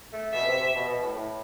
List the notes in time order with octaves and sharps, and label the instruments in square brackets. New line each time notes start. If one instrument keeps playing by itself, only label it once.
[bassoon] A3
[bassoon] B2 [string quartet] E5
[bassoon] C3
C3
B2
B2
A2
A2